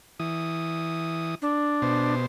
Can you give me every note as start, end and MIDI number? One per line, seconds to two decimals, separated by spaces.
0.20 1.35 52
0.20 1.35 87
1.42 2.14 62
1.82 2.26 47
1.82 2.26 72